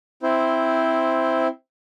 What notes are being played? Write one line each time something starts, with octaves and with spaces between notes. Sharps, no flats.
C4 E4 C5